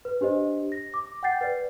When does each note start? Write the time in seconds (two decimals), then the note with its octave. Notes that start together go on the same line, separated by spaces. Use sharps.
0.05 B4
0.21 D4 G4 C5 D#5
0.72 A#6
0.94 D6
1.23 F#5 G5 G6 A6 C7
1.41 B4 D5